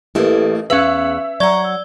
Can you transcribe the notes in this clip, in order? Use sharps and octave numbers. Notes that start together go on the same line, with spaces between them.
A1 A3 A#3 E4 G4 A4 B4
E2 C#4 G#4 B4 E5 F5 C#6 F#6
F#3 D5 F#5 A#5 C#6 G#6 G7
E6